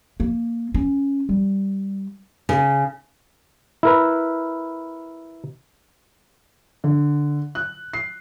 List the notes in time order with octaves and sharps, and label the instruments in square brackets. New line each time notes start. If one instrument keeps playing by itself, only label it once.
[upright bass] A#3
C#4
G3
[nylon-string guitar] C#3
[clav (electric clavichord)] E4 A#4 B4
[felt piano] D3
F#6
C7